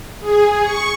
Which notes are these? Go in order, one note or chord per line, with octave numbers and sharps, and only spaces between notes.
G#4
C#6